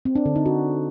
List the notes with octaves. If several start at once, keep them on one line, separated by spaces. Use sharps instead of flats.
C4
D4
D3
D#4
F#4